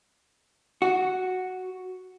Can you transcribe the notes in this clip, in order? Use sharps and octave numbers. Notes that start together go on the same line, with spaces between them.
F#4